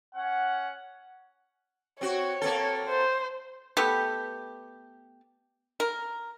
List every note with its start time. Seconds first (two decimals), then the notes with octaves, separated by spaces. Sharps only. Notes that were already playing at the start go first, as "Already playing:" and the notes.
0.16 C#4 F#5
2.01 C4 F#4 C#5
2.42 A#3 C4 A4
2.89 C5
3.77 A3 B3 G4
5.80 A#4